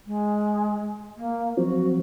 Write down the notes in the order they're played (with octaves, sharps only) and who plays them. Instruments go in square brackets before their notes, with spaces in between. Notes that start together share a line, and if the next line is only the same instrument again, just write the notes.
[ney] G#3
A#3
[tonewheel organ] F3 F#3 C4 [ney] F#4